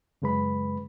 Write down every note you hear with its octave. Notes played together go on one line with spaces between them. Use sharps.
F#2 C#3 G#3 B4 B5